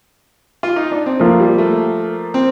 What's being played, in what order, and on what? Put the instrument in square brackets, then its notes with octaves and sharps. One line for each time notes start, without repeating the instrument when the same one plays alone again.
[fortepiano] F4
D#4
D4
C4
[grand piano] F3 A#3 F4 [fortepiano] A3
[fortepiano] G3
A3
C4